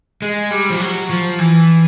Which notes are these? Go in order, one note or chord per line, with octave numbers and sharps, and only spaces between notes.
G#3
G3
F3
F#3
F3
E3